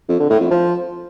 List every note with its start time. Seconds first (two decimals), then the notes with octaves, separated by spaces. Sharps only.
0.09 F2
0.19 D3
0.30 A2
0.40 F2
0.51 F3